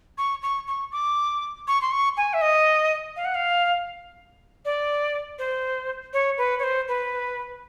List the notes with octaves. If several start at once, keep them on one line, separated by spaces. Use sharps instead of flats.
C#6
C#6
C#6
D6
C#6
C6
C#6
G#5
E5
D#5
F5
F#5
F5
D5
C5
C#5
B4
C#5
C5
B4